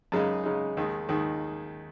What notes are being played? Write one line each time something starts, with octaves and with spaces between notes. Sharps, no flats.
F#2 C#3 G#3 D#4
F#2 C#3 G#3 D#4
D#2 D#3 G#3
D#2 D#3 G#3